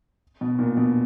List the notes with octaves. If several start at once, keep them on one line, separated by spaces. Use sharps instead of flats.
B2
A#2
B2